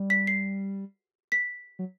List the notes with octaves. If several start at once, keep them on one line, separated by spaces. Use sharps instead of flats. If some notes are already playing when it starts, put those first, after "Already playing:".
Already playing: G3
B6
C7
B6
F#3